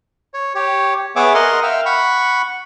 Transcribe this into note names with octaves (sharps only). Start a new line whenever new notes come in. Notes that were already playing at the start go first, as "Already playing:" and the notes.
C#5
G4 C#5
B3 G#4 C#5 E5 D6
A#4 D#5 F#5 C6
E5 F5 G5
F#5 B5 C#6